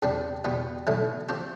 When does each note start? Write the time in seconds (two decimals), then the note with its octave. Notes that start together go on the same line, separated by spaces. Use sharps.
0.02 E2 C3 G3 D4
0.44 E2 B2 G3 B3
0.87 B1 A2 E3 A3 E4
1.29 F3 C4 G4